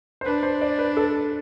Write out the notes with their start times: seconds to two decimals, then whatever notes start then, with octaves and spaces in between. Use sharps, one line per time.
0.21 C5
0.25 D4 B4
0.43 C5
0.61 D5
0.78 B4
0.97 A4